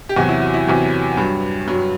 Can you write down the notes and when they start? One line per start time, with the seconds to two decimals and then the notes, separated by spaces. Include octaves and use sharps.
0.09 G4
0.16 E2 C3 F#3 F#4
0.29 E4
0.42 F#4
0.54 E4
0.67 E2 C3 F#3
1.17 G2 F#3
1.67 G2 F#3